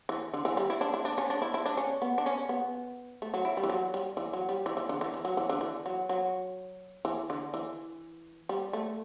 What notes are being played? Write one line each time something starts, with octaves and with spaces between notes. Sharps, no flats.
E3
D3
E3
G3
E4
D4
E4
D4
C#4
D4
E4
E4
D4
C#4
B3
D4
C#4
B3
A3
F#3
E4
G3
E3
F#3
G3
E3
F#3
G3
E3
E3
D3
E3
E3
F#3
E3
D3
E3
F#3
F#3
E3
D3
E3
G3
A3